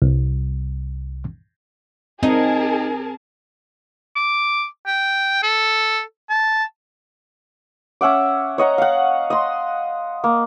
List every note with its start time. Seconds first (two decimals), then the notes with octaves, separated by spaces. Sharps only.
0.02 C2
2.23 C4 D#4 G#4 A#4 A5
4.16 D6
4.87 G5
5.43 A4
6.30 A5
8.01 C#4 E5 F#5 D6
8.58 C#5 D#5 F#5 A#5
8.78 F5 F#5
9.30 D#5 C6
10.24 A#3